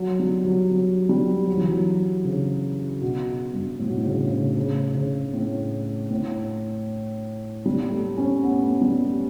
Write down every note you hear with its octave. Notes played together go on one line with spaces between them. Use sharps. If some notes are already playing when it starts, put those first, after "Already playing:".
Already playing: F#3
G3
F#3
F#3
G3
F#3
E3
F#3
C#3
B2
G2
A2
B2
A2
C#3
C#3
C#3
C#3
A2
A2
G3
A3
C#4
B3
A3
G3